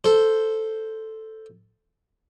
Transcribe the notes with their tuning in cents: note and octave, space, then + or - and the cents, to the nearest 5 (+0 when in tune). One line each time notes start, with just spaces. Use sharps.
A4 +0 C5 +0